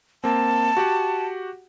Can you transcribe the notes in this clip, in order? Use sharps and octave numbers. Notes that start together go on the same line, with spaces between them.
A#3 C4 A5
F#4 G4 F#5